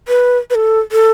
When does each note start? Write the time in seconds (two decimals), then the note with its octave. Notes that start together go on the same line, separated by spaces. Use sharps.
0.08 B4
0.50 B4
0.55 A4
0.92 A4